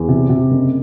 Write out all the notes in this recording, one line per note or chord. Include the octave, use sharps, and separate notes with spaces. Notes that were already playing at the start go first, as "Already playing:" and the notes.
Already playing: E2
C3
C3
F#1